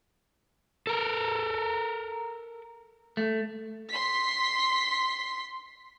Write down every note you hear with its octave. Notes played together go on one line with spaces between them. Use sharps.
A4 A#4
A3
C6 B6